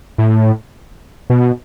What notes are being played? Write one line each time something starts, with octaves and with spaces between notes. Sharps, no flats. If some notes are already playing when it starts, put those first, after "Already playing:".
A2
B2